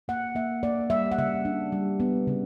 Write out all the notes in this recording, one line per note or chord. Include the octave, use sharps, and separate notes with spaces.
A#3 F#5
A#3 E5
A#3 D5
G3 E5
F#5
C#3 E5
D4
G3
B3
C#3